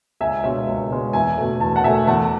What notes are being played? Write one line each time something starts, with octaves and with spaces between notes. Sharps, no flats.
C#2 E5 G#5
B2 G#3 C#5 E5
C#2
B2 G#3
E2 E5 G#5
B2 A3
E2 A5
F#5 A5
B2 A3 E5 G#5
E2 F#5 A5